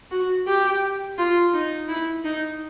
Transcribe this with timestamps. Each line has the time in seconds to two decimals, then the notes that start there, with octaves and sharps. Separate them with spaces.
0.11 F#4
0.47 G4
1.18 F4
1.54 D#4
1.89 E4
2.24 D#4